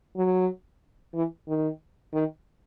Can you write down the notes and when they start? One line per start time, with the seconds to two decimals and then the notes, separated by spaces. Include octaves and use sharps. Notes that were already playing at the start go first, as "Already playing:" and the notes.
0.17 F#3
1.14 E3
1.48 D#3
2.13 D#3